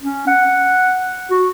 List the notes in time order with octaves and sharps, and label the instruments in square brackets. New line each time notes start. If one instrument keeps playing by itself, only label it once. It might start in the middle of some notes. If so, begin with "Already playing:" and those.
[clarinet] C#4
F#5
F#4